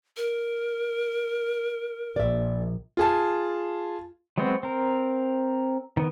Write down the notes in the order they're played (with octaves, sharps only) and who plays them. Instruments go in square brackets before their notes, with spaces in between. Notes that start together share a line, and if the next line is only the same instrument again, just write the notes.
[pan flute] A#4
[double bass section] A#1 [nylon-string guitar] D5 E5
[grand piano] F4 G#4 A5
[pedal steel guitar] F#3 G#3 B3 C4 F#4
C4 A#4
D#3 B3